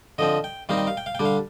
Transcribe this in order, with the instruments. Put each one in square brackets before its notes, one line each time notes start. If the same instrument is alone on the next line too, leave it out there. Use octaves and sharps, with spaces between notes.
[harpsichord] D3 F3 C4 D#5
G5
D#3 G3 C4 D#4 F5
G5
F5
G5
F5
G5
D3 G3 D4
F5